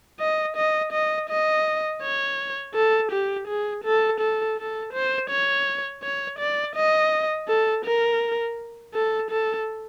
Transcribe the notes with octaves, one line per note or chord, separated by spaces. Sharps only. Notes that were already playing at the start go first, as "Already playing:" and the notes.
D#5
D#5
D#5
D#5
C#5
A4
G4
G#4
A4
A4
A4
C5
C#5
C#5
D5
D#5
A4
A#4
A4
A4